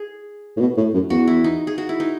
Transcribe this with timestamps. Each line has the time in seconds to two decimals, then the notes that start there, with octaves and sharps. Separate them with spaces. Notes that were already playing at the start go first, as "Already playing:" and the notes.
Already playing: G#4
0.57 A2
0.60 B2
0.77 A2
0.94 F#2
1.10 E2 F#4
1.27 E4
1.44 D#4
1.67 G#4
1.78 F#4
1.89 E4
2.00 D#4